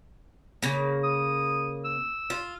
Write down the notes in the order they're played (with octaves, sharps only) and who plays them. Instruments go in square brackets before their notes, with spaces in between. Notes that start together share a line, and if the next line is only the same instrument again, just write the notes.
[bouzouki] C#3 A#3
[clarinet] D#6
E6
[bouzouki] F4